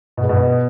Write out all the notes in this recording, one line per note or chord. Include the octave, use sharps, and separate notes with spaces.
B2
G#3
B2